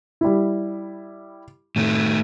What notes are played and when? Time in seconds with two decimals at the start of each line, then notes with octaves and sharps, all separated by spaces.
0.21 G3 E4
1.76 A2 D#3 A3